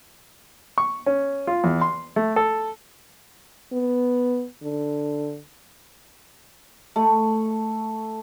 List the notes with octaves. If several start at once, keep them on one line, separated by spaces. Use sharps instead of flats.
C#6
C#4
F4
E2
C6
A3
A4
B3
D3
A3